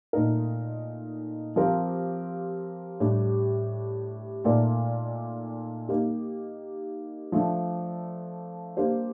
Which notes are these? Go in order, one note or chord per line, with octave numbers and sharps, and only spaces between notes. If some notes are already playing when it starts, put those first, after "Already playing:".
A#2 A3 D#4 A#4
F3 C4 G4 A#4 F5
A2 G3 D4 G4
A#2 A3 D#4 A#4 D5
A#3 D#4 G4
F3 A3 D4
A#3 D4 G4 C5